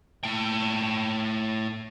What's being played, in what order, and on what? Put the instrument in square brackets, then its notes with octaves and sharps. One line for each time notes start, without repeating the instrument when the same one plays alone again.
[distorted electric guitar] A2 G5